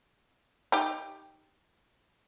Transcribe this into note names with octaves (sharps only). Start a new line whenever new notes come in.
D#4 G4